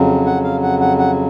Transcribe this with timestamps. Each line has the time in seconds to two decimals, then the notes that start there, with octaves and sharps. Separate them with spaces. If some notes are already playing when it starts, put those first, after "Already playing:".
Already playing: F2 C#3 F#3
0.26 F#5
0.44 F5
0.62 F#5
0.80 F#5
0.98 F#5